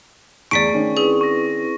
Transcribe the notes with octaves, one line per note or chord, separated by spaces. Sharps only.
E2 A3 G#4 D5 C#6 B6 D7
D#3 C#4 D4
C4 E4 G#4 B4
C#6 A#6